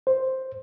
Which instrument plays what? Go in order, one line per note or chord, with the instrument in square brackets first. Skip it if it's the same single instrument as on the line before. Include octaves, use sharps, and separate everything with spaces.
[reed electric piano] C5